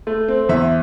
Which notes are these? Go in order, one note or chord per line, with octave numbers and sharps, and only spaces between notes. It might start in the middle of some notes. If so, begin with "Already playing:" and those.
A3
C4
E2 E5